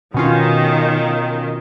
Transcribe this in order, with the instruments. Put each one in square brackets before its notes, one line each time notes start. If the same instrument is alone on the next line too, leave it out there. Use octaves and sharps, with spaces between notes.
[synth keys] B2 C#4 F4 [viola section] D#3